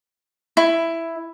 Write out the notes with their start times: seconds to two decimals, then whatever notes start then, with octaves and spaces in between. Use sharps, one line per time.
0.57 E4